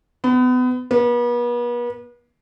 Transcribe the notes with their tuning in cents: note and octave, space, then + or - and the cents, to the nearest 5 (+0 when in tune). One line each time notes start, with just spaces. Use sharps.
B3 +30
B3 -40